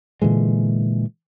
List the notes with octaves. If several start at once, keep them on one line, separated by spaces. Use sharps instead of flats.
A#2 D3 E3 G#3